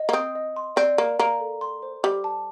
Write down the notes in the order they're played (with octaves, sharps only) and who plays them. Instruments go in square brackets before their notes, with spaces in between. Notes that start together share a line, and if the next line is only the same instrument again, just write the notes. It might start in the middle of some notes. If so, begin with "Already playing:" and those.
Already playing: [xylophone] D#5
[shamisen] A#3
[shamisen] C4 [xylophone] D#6
[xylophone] D#5
C6
[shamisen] C4 [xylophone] D5
[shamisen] A#3 [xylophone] A#4
[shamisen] A#3 [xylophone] A#5
[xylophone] A4
C6
C5
[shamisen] G3 [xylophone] D6
[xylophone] A5